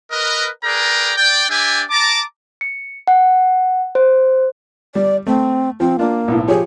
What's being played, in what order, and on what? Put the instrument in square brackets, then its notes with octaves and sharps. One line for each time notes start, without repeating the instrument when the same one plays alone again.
[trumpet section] A#4 B4 D#5
G#4 A#4 B4 D5 G5 A#5
D5 G5
D4 G4 D5 E5 G5 G#5
A5 A#5 D6
[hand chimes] C#7
F#5
C5
[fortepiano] G3 [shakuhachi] D5
[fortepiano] A3 [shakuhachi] C4
[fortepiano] F3 [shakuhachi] C4
[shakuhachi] A#3 [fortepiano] D4 F4
[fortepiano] B1 A2
[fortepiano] F3 G4 C#5 [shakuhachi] G#4